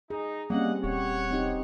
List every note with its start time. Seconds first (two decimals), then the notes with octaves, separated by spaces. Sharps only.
0.10 D#4 G#4
0.50 G3 A#3 C4 C#4 D#5 F#5
0.84 D#1 G4 C#5 F#5
1.31 C4 D#4 G4